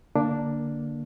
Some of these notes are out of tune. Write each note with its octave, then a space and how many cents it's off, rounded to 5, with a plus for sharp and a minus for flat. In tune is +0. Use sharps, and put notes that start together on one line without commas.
D3 +0 A#3 +0 D4 +0